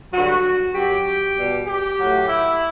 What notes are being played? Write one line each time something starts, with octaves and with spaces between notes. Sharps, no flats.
G2 D3 F#3 F#4
F#2 F#3 G4
B2 G3
G4
A2 F#3
E4